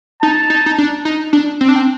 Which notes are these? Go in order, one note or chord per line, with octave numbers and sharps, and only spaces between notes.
D#4 A5
D#4
D#4
D4
D#4
D4
C4
D4
C4